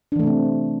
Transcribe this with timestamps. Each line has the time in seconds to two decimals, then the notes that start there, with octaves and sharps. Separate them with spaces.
0.12 D4
0.16 E3
0.19 A3
0.23 C3
0.27 C4